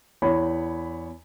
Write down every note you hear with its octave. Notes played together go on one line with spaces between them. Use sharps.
E2 C#5 B5